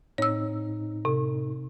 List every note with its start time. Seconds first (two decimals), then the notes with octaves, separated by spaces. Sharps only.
0.18 A2 C4 D#4 C#5 E6
1.05 C3